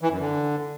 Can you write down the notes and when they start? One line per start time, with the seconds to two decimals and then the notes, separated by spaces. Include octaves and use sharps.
0.01 E3
0.10 F#2
0.20 D3